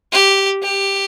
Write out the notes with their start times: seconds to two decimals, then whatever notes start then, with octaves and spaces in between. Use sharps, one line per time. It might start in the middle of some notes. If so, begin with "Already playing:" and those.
0.12 G4
0.63 G4